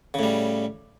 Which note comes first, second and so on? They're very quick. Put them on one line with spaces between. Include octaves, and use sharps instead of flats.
C#3 A2 G3